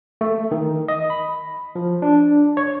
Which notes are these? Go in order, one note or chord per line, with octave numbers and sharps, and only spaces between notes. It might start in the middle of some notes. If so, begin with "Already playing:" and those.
A3
D#3
D#5
B5
F3
D4
C#5